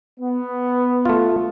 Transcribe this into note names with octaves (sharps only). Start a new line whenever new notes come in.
B3
A3 F4